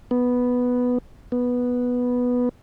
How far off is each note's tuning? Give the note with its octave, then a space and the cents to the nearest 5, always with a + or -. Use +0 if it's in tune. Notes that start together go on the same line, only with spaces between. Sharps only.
B3 +0
B3 -5